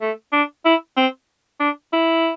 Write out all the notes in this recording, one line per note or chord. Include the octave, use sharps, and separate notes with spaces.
A3
D4
E4
C4
D4
E4